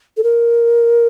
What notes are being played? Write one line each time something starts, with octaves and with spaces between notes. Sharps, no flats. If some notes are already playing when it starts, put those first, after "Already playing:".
A4
A#4